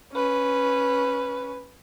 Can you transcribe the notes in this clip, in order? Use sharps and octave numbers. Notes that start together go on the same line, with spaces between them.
C#4 B4